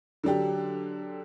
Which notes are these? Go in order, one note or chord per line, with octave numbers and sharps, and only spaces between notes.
D3 F#3 D4 G4